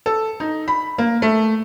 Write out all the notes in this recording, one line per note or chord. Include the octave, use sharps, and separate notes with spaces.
A4
D#4
B5
A#3
A3